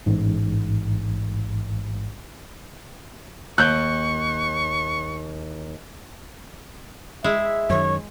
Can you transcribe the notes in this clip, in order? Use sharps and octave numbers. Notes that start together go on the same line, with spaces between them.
A1 G#2
D#2 C#6 F#6 G6 G7
G#3 E4 G#4 E5
F#2 D#3 C#5